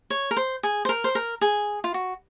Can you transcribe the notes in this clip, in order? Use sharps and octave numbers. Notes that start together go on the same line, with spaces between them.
C#5
A#4
C5
G#4
C5
A#4
C5
A#4
G#4
F4
F#4